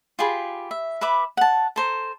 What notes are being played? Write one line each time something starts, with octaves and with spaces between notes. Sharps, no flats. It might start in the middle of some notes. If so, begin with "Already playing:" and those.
F4 G4 G#4 B5
E5
B4 E5 B5 D6
F#5 A5
A4 C5 A#5